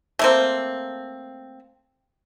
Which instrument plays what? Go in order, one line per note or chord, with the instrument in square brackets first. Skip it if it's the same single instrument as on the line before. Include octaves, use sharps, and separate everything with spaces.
[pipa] A3 A#3 C4